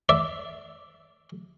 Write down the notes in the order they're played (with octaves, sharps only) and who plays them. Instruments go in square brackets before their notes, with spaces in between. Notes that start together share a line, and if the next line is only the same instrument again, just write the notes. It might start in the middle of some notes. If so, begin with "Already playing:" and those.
[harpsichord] D5 E5